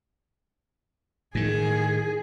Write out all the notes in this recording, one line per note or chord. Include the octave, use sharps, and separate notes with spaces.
A2 D#3 G#4